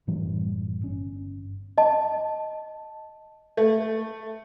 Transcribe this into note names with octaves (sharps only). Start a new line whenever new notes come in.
F#1 A2 E3 G3
G1 C#4
D#5 A5
A3